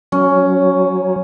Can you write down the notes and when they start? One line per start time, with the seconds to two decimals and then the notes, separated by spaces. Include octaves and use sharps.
0.12 F#3 C#4